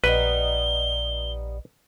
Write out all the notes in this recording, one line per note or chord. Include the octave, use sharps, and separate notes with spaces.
A#1 G3 B3 D#4 B4 G7